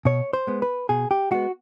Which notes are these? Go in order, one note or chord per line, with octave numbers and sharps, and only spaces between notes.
B2 C#5
C5
G#3 B3
B4
B2 G#4
G4
G#3 B3 F#4